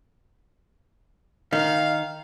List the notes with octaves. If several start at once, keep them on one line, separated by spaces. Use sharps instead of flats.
D#3 F5